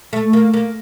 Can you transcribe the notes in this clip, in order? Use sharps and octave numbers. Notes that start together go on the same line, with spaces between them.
A3
A#3
A#3